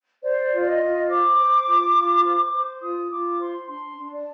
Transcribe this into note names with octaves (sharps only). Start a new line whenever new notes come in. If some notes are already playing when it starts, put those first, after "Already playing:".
C5 D5
F4
D5
D#5
F4
C5 D6
C5
F4
F4
C5
C5
F4 D#6
F4 D6
C5 C6
D4 C6
D4
D5